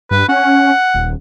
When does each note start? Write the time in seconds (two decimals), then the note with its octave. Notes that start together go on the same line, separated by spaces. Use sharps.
0.11 G2 B4
0.29 C#4 F#5
0.94 D#1